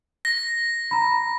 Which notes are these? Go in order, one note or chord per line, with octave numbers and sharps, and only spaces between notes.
A#6
A#5 B5